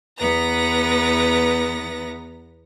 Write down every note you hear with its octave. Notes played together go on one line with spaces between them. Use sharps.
E2 B3 B4 A#5 A#6